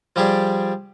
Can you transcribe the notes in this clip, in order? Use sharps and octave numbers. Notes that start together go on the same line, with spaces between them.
F3 G3 G4 G#4 D5